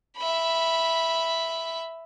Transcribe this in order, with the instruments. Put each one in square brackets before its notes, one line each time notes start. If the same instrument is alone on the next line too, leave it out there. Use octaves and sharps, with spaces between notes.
[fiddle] E5 B5